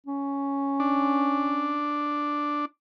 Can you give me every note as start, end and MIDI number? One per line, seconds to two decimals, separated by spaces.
0.06 1.81 61
0.80 2.65 62